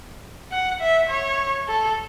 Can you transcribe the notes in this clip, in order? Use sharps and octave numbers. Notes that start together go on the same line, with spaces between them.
F#5
E5
C#5
A4